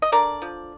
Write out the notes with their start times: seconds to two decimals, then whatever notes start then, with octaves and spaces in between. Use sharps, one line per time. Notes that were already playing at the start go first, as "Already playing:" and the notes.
0.02 D#5
0.12 D3 A#4 D5
0.42 F3